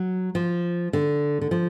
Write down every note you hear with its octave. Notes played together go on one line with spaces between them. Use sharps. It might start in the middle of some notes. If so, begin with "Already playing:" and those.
Already playing: F#3
F3
D3
D3
F3